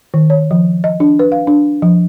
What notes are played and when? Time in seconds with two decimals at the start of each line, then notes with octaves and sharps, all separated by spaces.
0.14 D#3
0.30 C#5
0.51 F3
0.84 D#5
1.00 D4
1.19 B4
1.32 F5
1.47 D4
1.82 F3